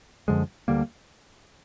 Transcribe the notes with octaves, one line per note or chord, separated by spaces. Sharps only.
F#2 D3 F3 G#3
D2 D3 G3 A#3